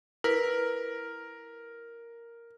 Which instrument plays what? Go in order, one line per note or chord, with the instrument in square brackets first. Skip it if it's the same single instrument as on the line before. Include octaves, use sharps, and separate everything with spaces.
[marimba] E4 B4 [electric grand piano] A#4